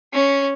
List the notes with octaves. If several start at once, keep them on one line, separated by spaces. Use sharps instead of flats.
C#4